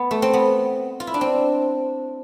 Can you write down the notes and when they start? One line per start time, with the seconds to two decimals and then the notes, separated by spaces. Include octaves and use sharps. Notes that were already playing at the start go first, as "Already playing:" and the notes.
Already playing: B3
0.11 A3
0.22 C4
0.33 B3
1.00 F4
1.07 E4
1.14 D4
1.21 C4